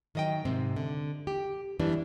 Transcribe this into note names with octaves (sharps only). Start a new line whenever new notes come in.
D#3 F#3 D#5 F#5 G5
G#2 C3 C4
D3
G4
F#2 E3 G3 B3 D4